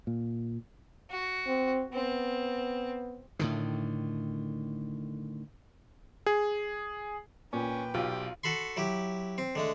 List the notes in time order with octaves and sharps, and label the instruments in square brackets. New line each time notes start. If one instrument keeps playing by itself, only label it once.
[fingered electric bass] A#2
[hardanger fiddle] F#4
[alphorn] C4
[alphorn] B3 [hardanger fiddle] C4
[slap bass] A2 D3 D#3
[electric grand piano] G#4
[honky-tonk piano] A#2 [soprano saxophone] C#4 [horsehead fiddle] B4 G5
[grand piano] B1 [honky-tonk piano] F4 [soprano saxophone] G4
[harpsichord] F#4 A4 B5 C6
F#3 E4 G4
C4
D3 G#3 A3